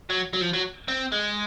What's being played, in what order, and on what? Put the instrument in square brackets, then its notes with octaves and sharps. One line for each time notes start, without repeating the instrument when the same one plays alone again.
[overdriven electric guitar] F#3
F#3
F3
F#3
C4
G#3